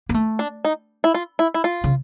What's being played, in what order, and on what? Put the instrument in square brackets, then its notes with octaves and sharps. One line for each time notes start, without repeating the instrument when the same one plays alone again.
[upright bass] A#3
A3
[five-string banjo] D4
D#4
E4
F4
E4
E4
F4
[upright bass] C#3